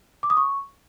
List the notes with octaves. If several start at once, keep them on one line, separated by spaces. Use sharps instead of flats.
D6
D#6
C#6